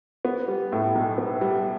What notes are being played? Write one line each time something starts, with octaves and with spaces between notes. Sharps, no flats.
B3
G3
A2
B1
B3
G3